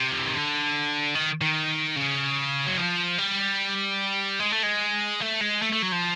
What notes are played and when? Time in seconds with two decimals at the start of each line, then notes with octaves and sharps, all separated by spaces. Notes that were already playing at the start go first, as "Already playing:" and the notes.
Already playing: C3
0.11 F3
0.18 E3
0.27 D#3
0.34 D3
1.15 D#3
1.41 D#3
1.96 C#3
2.66 F#3
2.77 F3
3.18 G3
4.39 G#3
4.52 A3
4.63 G#3
5.21 A3
5.41 G#3
5.62 A3
5.72 A3
5.82 F#3
5.92 F3